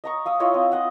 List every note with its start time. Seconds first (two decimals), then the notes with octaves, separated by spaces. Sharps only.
0.04 D#5 A#5 C#6
0.25 F5 D#6 E6
0.40 E4 F4 C#5 D#5
0.54 C4
0.72 F4 D#5 F#5